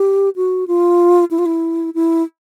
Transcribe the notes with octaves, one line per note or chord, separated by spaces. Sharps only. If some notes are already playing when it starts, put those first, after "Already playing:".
Already playing: G4
F#4
F4
E4
F4
E4
E4